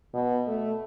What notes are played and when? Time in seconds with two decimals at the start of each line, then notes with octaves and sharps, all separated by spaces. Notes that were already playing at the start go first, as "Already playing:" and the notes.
0.14 B2
0.47 A3